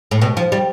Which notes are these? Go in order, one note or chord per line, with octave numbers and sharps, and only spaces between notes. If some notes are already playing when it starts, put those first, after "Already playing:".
A2
B2
F3
G3